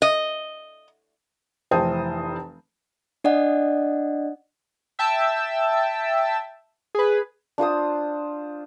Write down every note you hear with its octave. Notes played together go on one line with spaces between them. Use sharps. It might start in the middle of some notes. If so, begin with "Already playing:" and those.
D#5
F1 E3 C5 G5 A5 D#6
D4 D5 D#5 F#5
E5 G5 A5 E6
G#4 B4
D4 F4 C5 D#6